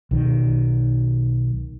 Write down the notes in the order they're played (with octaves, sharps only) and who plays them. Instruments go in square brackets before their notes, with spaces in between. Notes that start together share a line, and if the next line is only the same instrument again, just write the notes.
[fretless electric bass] B1 D#3